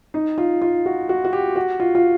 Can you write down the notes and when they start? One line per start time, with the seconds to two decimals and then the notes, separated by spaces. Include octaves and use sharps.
0.14 D#4
0.38 F4
0.62 F4
0.86 F#4
1.09 F#4
1.25 F#4
1.33 G4
1.56 F#4
1.80 F4
1.95 F4